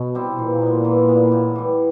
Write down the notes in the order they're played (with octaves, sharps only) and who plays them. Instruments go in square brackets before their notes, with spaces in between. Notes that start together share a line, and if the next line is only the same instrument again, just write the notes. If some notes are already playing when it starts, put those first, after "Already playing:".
Already playing: [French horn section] B2
[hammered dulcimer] G3 C4 E4
[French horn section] A#2 [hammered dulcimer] E3
[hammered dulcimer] G#3 B3
E3
G#3 B3
A2
E3 G3